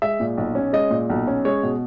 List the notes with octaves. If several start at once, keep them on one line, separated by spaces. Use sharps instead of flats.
G#3 E5
A#2
B1
C#4
G#3 D#5
A#2
B1
C#4
G#3 C#5
B2